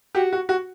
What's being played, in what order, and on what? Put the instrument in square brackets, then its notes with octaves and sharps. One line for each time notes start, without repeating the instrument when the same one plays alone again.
[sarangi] F#4 [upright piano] G4
[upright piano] F#4
F#4